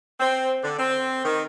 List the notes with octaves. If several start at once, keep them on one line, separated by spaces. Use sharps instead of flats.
C4
D3
C4
D#3